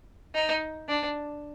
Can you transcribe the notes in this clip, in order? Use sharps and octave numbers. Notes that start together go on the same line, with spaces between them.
D#4
D4